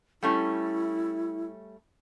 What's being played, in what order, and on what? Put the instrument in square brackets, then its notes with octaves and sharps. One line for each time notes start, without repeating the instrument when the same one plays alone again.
[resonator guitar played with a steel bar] G3 A3 C#4 [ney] E4